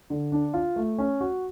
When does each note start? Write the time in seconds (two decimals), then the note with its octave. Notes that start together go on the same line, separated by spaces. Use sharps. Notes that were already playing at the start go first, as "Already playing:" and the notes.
0.10 D3
0.32 D4
0.54 F4
0.76 A3
0.98 C#4
1.21 F#4